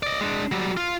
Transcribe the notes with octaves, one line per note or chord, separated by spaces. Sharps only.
D5 D#5
G#3 D4
F#3 G3
F4